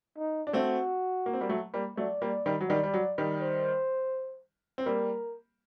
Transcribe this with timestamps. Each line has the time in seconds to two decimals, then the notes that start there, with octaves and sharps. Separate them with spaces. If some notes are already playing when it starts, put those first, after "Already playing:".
0.18 D#4
0.47 D4
0.53 A3 C4 F#4
1.26 A#3
1.33 C4
1.41 G3 A#3
1.50 F#3 A3
1.74 G3 A#3
1.97 F#3 A3 D5
2.22 G3 A#3
2.46 D#3 G3
2.61 F#3
2.69 D#3 G3 D5
2.84 G3
2.94 F#3
3.18 D#3 G3
3.41 C5
4.78 C4
4.86 G3 A#3 A#4